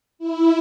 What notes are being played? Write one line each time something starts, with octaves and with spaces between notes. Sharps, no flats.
E4